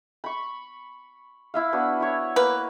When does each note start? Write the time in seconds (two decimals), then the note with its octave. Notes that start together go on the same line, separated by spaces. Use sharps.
0.24 B5 C#6
1.54 E4 E5 F5
1.73 B3 D4 F#4
2.00 E4 C#5
2.36 A#3 B4